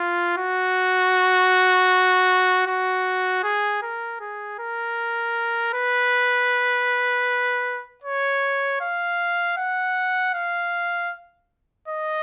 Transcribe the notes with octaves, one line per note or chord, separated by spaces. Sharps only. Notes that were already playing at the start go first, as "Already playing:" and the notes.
Already playing: F4
F#4
F#4
G#4
A#4
G#4
A#4
B4
C#5
F5
F#5
F5
D#5